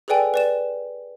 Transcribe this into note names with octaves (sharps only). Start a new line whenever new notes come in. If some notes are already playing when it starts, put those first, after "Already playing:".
G#4 A4 B4 D5 G5 G#5
B4 D5 E7